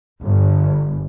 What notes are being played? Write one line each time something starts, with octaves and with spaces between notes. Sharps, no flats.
G1